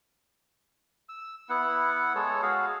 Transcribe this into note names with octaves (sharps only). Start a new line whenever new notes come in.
E6
B3 E4 F#5
G#3 A4 C#5
F#4 G#4 F5